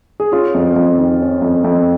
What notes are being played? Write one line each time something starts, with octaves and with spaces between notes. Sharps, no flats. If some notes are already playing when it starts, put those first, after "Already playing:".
G#4
C#4 F4
F2
F2
D#3
C#4
F2
F2